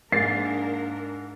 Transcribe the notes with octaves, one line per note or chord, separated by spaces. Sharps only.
G#2 A#3 D4 G#4 A#4 A6 C7